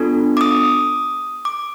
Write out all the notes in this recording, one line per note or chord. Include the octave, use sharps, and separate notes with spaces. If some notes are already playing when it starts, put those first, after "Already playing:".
Already playing: B3 D4 F4 A4
D6
D#6
D6